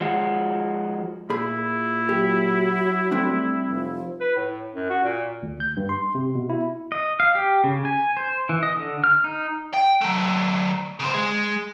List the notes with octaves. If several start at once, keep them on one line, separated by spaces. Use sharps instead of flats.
F3 G#3 F#4
A#2 E4 G#4 B5
F#3 G4
G3 A3 C4 D4
F1 F3
B4
A2
F#2
F#4
A#2
D2
G6
G2
C6
C3
B2
E4
D#5
F5
G4
C#3
G#5
C5
E3
D#5
D3
F6
D#4
G5
F#3 A3
C#3 C5
G#3